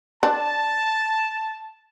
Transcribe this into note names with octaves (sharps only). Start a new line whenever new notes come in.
D4 A5